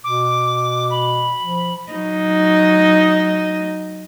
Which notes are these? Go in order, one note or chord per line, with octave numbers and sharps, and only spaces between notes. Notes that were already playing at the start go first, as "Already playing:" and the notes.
B2 D6
B5
F3
F#3 D#4